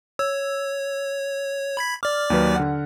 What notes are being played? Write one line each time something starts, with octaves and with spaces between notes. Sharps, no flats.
C#5 E6
B5 G#6 B6
D5 D6 F6
D#2 F#3 B4
D3 F#5